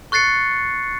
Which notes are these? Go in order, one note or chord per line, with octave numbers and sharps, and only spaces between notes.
C#6 F#6 A6 C7 C#7